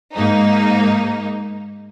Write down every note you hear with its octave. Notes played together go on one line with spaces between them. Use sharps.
G#2 A#3 D#4